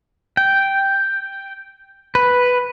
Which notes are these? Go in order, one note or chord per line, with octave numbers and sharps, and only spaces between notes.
G5
B4